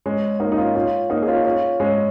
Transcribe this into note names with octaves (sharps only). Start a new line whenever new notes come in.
G#3 C#4
A#3 D#4
D#4
C#4 F4
C#4 F4
A#3 D#4
G#4
C#4 F4
C#4 F4
G#3 C#4